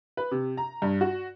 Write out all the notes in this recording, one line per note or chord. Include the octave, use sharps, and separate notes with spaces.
B4
C3
A#5
G2
F#4